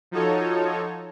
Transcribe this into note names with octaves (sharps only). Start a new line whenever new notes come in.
F3 D#4 F#4 A4 C#5